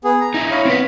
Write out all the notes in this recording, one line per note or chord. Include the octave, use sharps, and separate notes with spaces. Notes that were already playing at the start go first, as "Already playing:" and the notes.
B3 G#4
A#5
D#4 E4
C#5 F5 B5
C4 B4